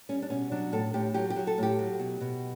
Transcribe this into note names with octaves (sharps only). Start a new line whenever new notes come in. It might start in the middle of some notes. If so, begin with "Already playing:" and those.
G3 C#4
D4
B2 C#4
F#3 D4
A2 A4
A2 G4
F#3 G4
G4
F#3
A4
A2 G4
F#3
B2
B2